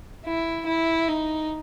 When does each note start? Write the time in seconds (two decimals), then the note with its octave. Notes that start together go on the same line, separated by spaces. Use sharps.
0.24 E4
0.66 E4
1.08 D#4